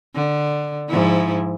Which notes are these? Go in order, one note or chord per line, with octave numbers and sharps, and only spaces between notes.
D3
G#2 F3 E4